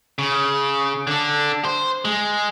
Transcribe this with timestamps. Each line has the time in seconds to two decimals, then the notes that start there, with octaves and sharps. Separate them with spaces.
0.19 C#3
1.07 D3 D4
1.65 C5
2.05 G#3